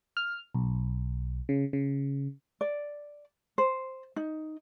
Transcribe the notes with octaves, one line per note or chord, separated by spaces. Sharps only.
F6
B1
C#3
C#3
D5
C5
D#4